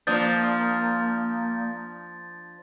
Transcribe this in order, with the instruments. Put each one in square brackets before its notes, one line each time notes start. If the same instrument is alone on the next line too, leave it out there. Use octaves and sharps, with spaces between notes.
[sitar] F3 D4 [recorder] A#3 [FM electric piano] D5 D#6 G6 [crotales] A6